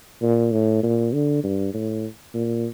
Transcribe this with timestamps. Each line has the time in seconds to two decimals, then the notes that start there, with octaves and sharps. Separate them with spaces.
0.22 A#2
0.52 A2
0.83 A#2
1.13 D3
1.44 G2
1.74 A2
2.35 A#2